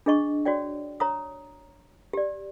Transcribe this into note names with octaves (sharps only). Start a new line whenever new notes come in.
D4 G#4 D#5 C#6
F#4 C#5 D5 G5
C#5 A#5 D#6
G4 D5